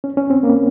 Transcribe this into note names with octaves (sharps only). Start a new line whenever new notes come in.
C#4
C#4
C4
A#3